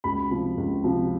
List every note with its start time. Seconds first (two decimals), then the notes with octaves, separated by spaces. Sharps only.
0.04 C#2 B5
0.31 C3 F3
0.57 C#2
0.84 C3 F3